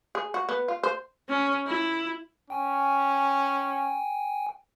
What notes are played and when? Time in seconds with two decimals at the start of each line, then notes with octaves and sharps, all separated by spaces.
0.15 G#4
0.34 F#4
0.49 B3
0.68 F4
0.83 C5
1.29 C#4
1.67 E4
2.50 C#4 G5 G#5